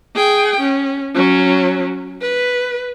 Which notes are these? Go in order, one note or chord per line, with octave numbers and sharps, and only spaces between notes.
G#4 G5
C#4
F#3 C#4
B4